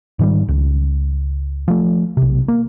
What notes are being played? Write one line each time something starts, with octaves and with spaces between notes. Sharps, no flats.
G#2 D#3 E3 G3
C#2
F3 A3
B1 C3
A#3